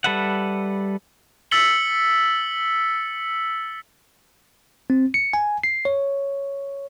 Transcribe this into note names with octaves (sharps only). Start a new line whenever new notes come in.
G3 A4 B4 E5 F#5
E6 A6 B6 C#7 F#7 G7
C4
C#7
G#5
C7
C#5